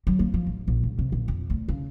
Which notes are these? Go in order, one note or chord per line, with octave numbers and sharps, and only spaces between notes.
F#3
A#3
F3
A1
A#1
C#2
C3
A#1
F2
D2
C#3